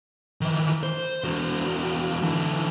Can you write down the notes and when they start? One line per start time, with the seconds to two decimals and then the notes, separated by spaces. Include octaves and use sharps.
0.41 D#3 E3
0.83 C5
1.24 E2 F#4
2.23 D3 E3